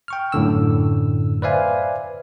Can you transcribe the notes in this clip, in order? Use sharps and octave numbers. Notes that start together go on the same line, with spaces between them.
G5 C#6 F6
F#2 A2 D3 E6
B4 C5 D5 E5 F5 G#5